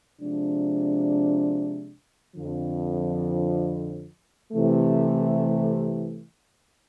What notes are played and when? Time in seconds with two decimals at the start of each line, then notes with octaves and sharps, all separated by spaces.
0.21 C3 F3 G#3 D4
2.36 F2 D3 F3
4.52 C3 E3 A3